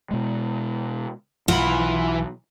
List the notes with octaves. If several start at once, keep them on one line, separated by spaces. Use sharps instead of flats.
B2 G#3
B1 E3 F4 F#5 B5